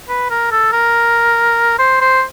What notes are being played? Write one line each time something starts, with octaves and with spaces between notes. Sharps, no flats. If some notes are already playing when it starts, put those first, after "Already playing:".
B4
A#4
A4
A#4
C5
C5